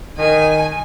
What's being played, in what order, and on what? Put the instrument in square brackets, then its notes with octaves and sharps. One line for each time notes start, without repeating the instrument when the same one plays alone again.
[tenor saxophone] D#3 [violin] G#5